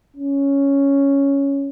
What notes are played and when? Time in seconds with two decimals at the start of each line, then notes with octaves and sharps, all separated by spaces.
0.16 C#4